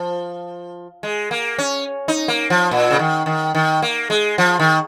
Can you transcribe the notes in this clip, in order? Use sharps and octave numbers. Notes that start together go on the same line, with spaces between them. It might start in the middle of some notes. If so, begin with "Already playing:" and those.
Already playing: F3
G#3
A#3
C#4
D#4
A#3
F3
A#2
C#3
D#3
D#3
D#3
A#3
G#3
F3
D#3